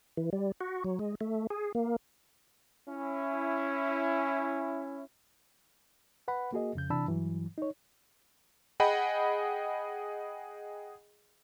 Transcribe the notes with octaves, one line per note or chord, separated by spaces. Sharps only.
E3
G3
F#4
F#3
G#3
A3
G#4
A#3
C#4 E4
B4 F#5 B5
A#3 F#4 G#4 D#5
F2 C#3 G6
C3 E3 D4 A5 B5 E6
G2 E3 F#3
D#4 C#5
G#4 D#5 F#5 G5 B5